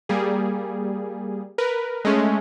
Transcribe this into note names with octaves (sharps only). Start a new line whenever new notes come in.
G3 A#3 G#4
A#4 B4
G#3 A3 C#4